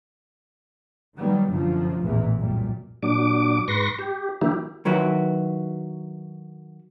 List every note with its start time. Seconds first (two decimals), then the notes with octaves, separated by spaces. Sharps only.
1.17 D#3 F#3 G3 B3
1.49 F1 F#2 D3 F3
2.02 A1 E2 A#2 E3
2.36 C2 F#2 A#2 G3
3.03 A#2 F#3 D4 D6
3.68 G#2 B4 C6 C#6 A#6
3.99 G4
4.41 D3 E3 F#3 A#3 E4 G4
4.85 D#3 F#3 E4 F#4 B4